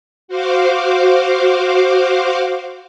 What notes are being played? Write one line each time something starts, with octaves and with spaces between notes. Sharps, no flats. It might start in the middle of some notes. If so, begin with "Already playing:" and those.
F#4 C5 F5 D6